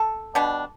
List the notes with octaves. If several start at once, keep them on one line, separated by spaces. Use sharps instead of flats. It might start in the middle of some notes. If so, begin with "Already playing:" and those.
Already playing: A4
B2 G3 D4